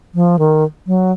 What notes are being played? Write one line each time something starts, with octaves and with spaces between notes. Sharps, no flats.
F3
D#3
F#3